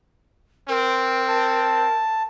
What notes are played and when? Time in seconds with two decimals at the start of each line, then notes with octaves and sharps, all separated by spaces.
0.69 C4 A#4
1.28 A5